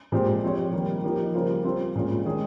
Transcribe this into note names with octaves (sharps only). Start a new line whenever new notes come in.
A#2 G#3 C4 G4 C5
F3 C4 G4 C#5
D#3 G3 A#3
F3 A#3 D#4 G4
C#3 G3 A#3 F4 C5
G3 C4 F4 C5
A#2 G#3 C#4 F4
D#3 G#3 C#4 G#4